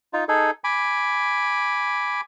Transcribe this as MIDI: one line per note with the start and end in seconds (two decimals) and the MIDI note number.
0.13 0.24 63
0.13 0.24 65
0.28 0.51 63
0.28 0.51 68
0.28 0.51 69
0.64 2.21 80
0.64 2.21 83
0.64 2.21 86